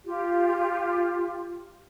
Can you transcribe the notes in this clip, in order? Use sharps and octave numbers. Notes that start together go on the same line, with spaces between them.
F4 G4